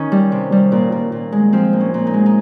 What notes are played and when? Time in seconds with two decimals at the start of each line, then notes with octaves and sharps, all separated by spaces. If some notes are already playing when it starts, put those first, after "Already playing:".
Already playing: D#3 C#4 D#4
0.12 G3
0.32 C3
0.52 G3
0.72 A#2
0.92 A#2
1.12 A#2
1.32 G#3
1.53 F3 C4
1.73 A#2
1.81 C#4
1.94 A#2
2.07 D#4
2.14 G#3
2.26 D#4